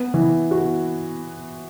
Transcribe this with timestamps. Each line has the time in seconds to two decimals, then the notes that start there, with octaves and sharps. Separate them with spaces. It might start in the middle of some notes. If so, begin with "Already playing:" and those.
Already playing: B3
0.14 E3
0.51 F#4